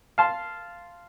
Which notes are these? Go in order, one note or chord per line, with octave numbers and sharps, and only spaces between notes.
F5 A5 C6